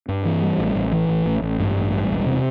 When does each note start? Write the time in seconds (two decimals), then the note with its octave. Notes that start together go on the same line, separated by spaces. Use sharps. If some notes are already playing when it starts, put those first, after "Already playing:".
0.09 G2
0.25 E3
0.42 G3
0.58 A1
0.75 A1
0.92 E3
1.09 A1
1.26 A1
1.42 A1
1.60 G2
1.76 A1
1.93 G3
2.10 E1
2.26 C3